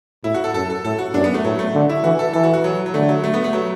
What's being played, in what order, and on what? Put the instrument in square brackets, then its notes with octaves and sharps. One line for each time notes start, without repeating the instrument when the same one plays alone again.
[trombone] A2 [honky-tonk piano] E4
[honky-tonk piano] F#4
A4
[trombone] F#2 [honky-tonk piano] A4
[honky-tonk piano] A4
[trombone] A2 [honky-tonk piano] A4
[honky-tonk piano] F#4
[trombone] F#2 [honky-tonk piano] D4
[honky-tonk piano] B3
A3
[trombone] A2 [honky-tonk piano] F#3
[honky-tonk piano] A3
[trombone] D3
[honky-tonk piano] E4
[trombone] E3 [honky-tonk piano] F#4
[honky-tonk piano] A4
[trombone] E3 [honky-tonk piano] A4
[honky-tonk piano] F#4
F#4
F#3
F#3
[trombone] D3 [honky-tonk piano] A3
[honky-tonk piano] F#3
A3
B3
A3
F#3